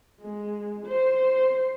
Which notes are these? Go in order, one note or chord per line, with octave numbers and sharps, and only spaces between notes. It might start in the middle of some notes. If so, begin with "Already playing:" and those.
G#3
C5